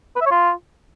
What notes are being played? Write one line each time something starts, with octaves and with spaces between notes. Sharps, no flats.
B4
E5
C#5
F4